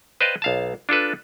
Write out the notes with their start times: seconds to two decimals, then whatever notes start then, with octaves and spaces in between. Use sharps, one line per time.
0.21 B4 C5 D5 D#5 F5 G5
0.42 B1 F5 A5
0.89 D4 F4 A4 B4